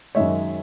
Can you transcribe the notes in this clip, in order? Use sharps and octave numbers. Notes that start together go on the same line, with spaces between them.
F#2 D#3 G#3 C#5 E5